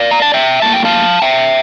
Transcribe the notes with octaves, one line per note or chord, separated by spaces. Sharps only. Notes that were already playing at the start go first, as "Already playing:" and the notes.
Already playing: D5 F5
A#5
A5
E5 G5
A2 G3 A#3 A5
G5
F5 A5
E5 G5